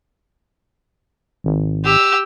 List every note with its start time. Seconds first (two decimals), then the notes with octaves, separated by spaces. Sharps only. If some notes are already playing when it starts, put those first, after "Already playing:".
1.44 G#1
1.85 G4 E6